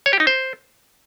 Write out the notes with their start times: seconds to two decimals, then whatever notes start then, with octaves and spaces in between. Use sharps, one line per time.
0.06 C#5
0.13 G4
0.20 D#4
0.27 C5